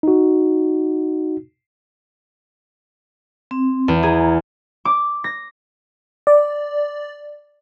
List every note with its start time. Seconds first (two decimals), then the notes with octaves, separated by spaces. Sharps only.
0.03 D#4 F#4
3.51 C4
3.88 E2
4.03 G#4 A#5
4.85 D6
5.24 A#6
6.27 D5